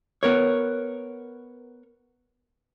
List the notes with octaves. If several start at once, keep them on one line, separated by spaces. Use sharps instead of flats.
B3 A#4 C#5